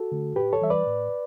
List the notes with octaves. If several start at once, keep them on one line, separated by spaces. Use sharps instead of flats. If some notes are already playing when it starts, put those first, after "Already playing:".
Already playing: F#4 A4
D3 A3
A2 G4 B4
A4 C#5
E3 G3 E5
B4 D5
A2